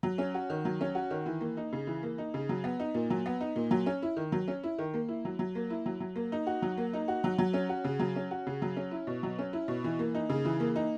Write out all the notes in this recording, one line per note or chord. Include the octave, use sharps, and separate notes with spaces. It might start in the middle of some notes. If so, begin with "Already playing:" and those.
F#3
C#4
F#4
D#3
F#3
C#4
F#4
D#3
E3
A#3
D#4
C#3
E3
A#3
D#4
C#3
F#3
B3
D#4
A#2
F#3
B3
D#4
A#2
F#3
C#4
E4
D#3
F#3
C#4
E4
D#3
A#3
E4
F#3
F#3
A#3
E4
F#3
F#3
A#3
D#4
F#4
F#3
A#3
D#4
F#4
F#3
F#3
C#4
F#4
C#3
F#3
C#4
F#4
C#3
F#3
C#4
E4
B2
F#3
C#4
E4
B2
E3
A#3
D#4
C#3
E3
A#3
D#4